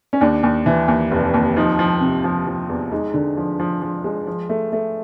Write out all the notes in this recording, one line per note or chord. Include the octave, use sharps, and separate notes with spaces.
C#4
D#2 D4
D#2
E3
D#2
F1
D#2
F3 D#4
F3
C3
F3
F3
E2
G#3 D#4
D3
F3
F3
F3
G#3
F3
A3
A3